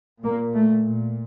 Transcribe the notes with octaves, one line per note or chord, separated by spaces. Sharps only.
A#2 A#3
A3
A#2